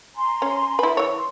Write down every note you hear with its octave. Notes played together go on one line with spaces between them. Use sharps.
G#5 A#5 C6
C#4
E4 B4
E3 C#5
C6